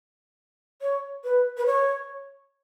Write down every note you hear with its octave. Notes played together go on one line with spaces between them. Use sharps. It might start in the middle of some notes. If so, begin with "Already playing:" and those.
C#5
B4
B4
C#5